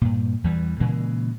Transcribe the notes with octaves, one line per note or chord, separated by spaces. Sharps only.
G2 A#2
E2 E3 G3
A#2 C#3 E3 G#3